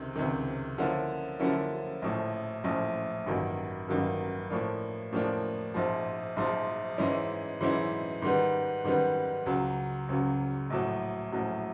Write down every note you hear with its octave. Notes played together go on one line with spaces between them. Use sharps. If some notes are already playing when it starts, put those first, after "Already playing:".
Already playing: C#2 C3 D#3
C#2 C3 D#3
D3 F3 A#3 C#4 E4
D3 F3 A#3 C#4 E4
A#1 A2 F3
A#1 A2 F3
A1 G2 D#3 F#3 A#3
A1 G2 D#3 F#3 A#3
A2 F3 A#3 D4
A2 F3 A#3 D4
A#1 G#2 F3
A#1 G#2 F3
G#2 E3 G#3 C#4 E4
G#2 E3 G#3 C#4 E4
G#2 D#3 G3 B3
G#2 D#3 G3 B3
C#2 C#3 F#3
C#2 C#3 F#3
A#1 A2 F#3
A#1 A2 F#3